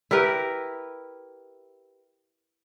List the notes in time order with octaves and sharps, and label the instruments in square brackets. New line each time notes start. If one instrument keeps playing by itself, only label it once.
[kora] E4 G4 A#4 B4